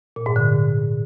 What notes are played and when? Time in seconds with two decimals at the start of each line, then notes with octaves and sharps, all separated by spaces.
0.16 A#2
0.26 G#2
0.36 D3